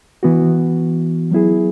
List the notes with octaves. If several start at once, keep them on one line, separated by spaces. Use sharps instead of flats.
E3 B3 F#4
F#3 B3 E4 G#4